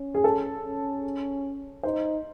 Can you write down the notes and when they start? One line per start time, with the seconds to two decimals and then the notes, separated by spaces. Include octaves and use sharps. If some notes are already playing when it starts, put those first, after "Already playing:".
Already playing: C#4
0.14 G#4
0.24 A4
0.64 C#4
1.83 D#4 C5